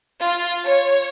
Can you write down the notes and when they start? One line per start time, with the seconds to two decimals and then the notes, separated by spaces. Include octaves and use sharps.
0.22 F4
0.63 C#5